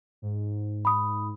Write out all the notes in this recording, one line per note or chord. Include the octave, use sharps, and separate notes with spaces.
G#2
B5 D#6